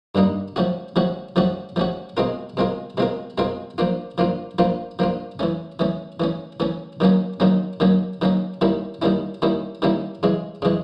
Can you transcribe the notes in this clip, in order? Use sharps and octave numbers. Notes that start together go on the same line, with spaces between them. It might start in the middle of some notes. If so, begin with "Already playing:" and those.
G2 D3 G3 A#3 D#4
F3 A3 C#4 F#4
F3 A3 C#4 F#4
F3 A3 C#4 F#4
F3 A3 C#4 F#4
B2 G#3 C4 F4 A#4
B2 G#3 C4 F4 A#4
B2 G#3 C4 F4 A#4
B2 G#3 C4 F4 A#4
F3 A#3 D4 F4
F3 A#3 D4 F4
F3 A#3 D4 F4
F3 A#3 D4 F4
E3 A3 C#4
E3 A3 C#4
E3 A3 C#4
E3 A3 C#4
D#3 F#3 A#3 C#4
D#3 F#3 A#3 C#4
D#3 F#3 A#3 C#4
D#3 F#3 A#3 C#4
D#3 G3 A#3 C#4 E4
D#3 G3 A#3 C#4 E4
D#3 G3 A#3 C#4 E4
D#3 G3 A#3 C#4 E4
C#3 E3 G#3
C#3 E3 G#3